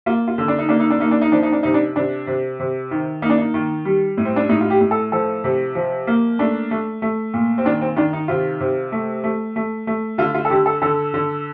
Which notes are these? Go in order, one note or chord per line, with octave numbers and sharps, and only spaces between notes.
A#3 F4
F4
D3
D4
D#4
A#3 D4
D#4
D4
A#3 D#4
D4
D#4
F3 D4
D#4
D4
C3 D#4
D4
C3 D4
C3
C3
D#3
A#3 D#4
D4
D#4
D#3
G3
A2
C4
D4
A2 D#4
F4
G4
A2
A4
F3 A4
C3
F3
A#3
A3 D4
A3
A3
A#2
C4
D#3 D4
C4
D#3 D4
D#4
C3 F4
C3
A3
A3
A3
A3
D3 F4
F4
A4
D3 G4
A4
D3 A4
D3